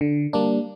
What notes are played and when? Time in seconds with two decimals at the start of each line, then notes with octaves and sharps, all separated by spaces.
0.01 D3
0.33 G3 A#3 D4